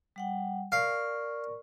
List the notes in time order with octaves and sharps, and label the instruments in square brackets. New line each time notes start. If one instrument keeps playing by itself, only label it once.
[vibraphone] G3 F#5 G5
[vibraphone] A#4 D5 C#6 [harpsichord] F5